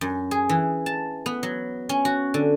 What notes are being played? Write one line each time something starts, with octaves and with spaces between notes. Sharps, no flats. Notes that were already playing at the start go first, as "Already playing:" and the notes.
F#2
G#4
E3
A5
B3
F#3
C#4
F#4
D3